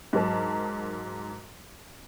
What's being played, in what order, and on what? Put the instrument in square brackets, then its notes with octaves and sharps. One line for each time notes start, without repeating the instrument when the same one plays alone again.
[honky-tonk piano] G#2 F#3 A#4 A5